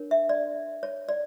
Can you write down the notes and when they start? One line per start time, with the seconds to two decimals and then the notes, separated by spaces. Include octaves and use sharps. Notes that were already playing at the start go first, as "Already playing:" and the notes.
Already playing: D4 A#4 C#5
0.11 E5
0.29 D5
0.83 C#5
1.09 D5